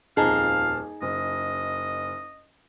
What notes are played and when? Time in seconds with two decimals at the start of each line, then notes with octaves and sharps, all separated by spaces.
0.17 D#1 F2 D#4 G#4 F5 A5
1.02 F#1 D#5